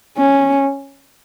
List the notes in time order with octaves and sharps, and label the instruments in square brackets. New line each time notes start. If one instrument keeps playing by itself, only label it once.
[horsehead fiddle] C#4